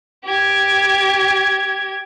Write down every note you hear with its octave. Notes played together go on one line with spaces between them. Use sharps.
G4 G#6